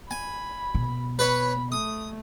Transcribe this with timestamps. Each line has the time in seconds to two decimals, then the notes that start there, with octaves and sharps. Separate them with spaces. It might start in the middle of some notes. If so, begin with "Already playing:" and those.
0.11 G#5 B5
0.75 B2
1.19 B4 C#5 B5
1.72 A3 D#6